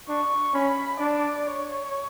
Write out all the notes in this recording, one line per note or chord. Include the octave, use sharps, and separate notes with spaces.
D4 C#6
C#4 B5
D4 D5
C#5